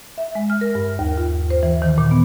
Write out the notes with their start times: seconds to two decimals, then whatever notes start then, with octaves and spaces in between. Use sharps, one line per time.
0.18 E5
0.35 G#3
0.50 F6
0.61 A#4
0.75 G2
0.99 D#2
1.18 F4
1.50 C5
1.63 E3
1.82 D#3
1.98 A#2
2.11 B3